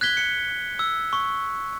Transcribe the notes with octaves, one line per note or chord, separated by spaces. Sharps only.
F#6 G#6 B6 G7
C#7
E6
C#6